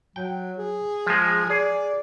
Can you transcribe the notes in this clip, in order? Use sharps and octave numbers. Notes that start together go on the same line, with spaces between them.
F#3 G5
G#4
F3 G#3
G#4 D5